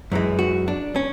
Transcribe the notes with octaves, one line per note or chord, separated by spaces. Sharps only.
F#2 E3 G#3
F#4
D4
C#4